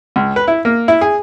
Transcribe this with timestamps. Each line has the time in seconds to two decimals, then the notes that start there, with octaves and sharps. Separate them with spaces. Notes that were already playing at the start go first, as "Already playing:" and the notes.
0.16 C#2
0.36 B4
0.48 E4
0.65 A#3
0.88 E4
1.01 G#4